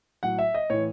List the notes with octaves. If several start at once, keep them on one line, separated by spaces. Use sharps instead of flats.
A2 F#3 F#5
E5
D#5
A2 E3 C#5